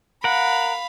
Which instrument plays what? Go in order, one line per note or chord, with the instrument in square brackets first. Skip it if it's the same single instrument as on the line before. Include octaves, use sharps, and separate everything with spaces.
[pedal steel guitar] A#4 F#5 [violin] F5 B5